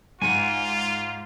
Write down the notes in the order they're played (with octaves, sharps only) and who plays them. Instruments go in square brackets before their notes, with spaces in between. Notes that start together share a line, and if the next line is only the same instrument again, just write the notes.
[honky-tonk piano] G#2 [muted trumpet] F4 [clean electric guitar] F#5 G#5